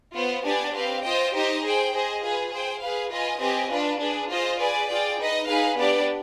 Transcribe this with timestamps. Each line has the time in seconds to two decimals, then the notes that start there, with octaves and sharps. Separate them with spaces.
0.15 B3 F4 C5
0.44 B3 D4 G4 D5 G#5
0.74 C4 G4 B4 F5
1.03 F4 C5 D#5 G5
1.34 D#4 G4 C5 D#5
1.63 G#4 C5 G5
1.93 G#4 C5 D#5
2.22 F4 G#4 B4
2.51 G#4 C5 G5
2.81 G#4 B4 F5
3.11 F4 B4 D#5 G#5
3.40 C4 G4 B4 D#5 G#5
3.70 D4 F4 B4
4.00 D4 G#4 B4
4.30 F4 G#4 C5 D#5
4.59 G#4 B4 D5 G#5
4.89 F4 G#4 D5 G5
5.19 D#4 B4 D#5
5.48 D#4 G#4 B4 F5
5.77 B3 D4 G4 B4 D5